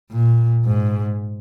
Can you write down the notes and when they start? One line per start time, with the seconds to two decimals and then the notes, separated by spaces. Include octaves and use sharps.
0.11 A#2
0.65 G#2